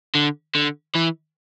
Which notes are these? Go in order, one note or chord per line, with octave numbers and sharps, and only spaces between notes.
D3
D3
E3